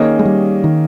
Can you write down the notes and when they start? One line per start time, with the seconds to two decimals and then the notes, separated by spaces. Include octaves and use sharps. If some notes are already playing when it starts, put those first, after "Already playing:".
Already playing: D#3 A#3 C#4 G#4 D#5
0.19 G#3
0.25 G3
0.64 D#3